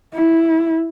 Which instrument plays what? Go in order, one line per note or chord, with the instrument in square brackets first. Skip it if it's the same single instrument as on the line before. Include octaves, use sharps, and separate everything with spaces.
[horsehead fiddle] E4